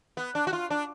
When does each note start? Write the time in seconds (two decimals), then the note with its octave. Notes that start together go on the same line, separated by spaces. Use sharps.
0.17 B3
0.35 D4
0.47 F#4
0.53 F4
0.70 D4